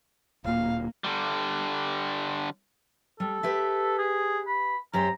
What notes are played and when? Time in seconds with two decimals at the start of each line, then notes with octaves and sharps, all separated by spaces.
0.44 D1 A#2 A#3 F5
1.04 D3 G3
3.20 G3 A4
3.43 G4 B4 E5
3.99 G#4
4.47 B5
4.93 F#2 G4 C5 A#5